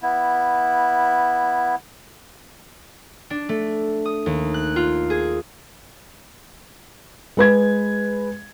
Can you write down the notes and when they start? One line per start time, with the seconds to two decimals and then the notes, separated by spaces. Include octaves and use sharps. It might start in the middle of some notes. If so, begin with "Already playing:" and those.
0.03 B3 E4
3.30 D4
3.49 A3
4.05 D#6
4.26 D#2
4.54 F#6
4.76 F4
5.10 G#4
7.37 G#3 B4 G#6